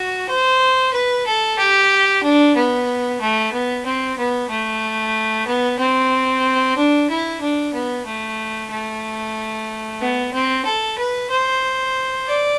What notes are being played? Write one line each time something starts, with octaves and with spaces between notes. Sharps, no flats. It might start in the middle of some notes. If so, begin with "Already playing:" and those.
Already playing: F#4
C5
B4
A4
G4
D4
B3
A3
B3
C4
B3
A3
B3
C4
D4
E4
D4
B3
A3
A3
B3
C4
A4
B4
C5
D5